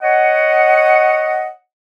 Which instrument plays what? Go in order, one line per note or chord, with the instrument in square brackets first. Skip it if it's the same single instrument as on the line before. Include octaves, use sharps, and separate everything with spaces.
[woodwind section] C#5 D#5 F#5